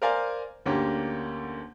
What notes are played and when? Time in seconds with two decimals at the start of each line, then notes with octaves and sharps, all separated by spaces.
0.02 A#4 C5 D5 F5 G#5
0.66 D2 D3 A#3 C#4 G4